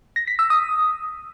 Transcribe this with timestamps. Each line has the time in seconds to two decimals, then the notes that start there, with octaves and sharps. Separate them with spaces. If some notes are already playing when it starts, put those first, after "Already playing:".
0.16 A#6
0.27 B6
0.39 E6
0.50 D#6